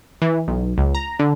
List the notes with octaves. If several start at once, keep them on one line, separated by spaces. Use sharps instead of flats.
E3
B1
C#2
A#5
D3